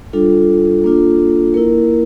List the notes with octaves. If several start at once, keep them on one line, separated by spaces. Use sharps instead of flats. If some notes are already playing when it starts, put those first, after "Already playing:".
G3 D4 F4 A4
A#3 D4 F4
A#3 E4 A#4